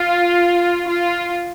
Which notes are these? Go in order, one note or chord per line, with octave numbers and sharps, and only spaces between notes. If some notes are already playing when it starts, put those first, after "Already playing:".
Already playing: F4
F4